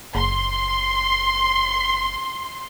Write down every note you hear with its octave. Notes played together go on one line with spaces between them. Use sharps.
F#1 C6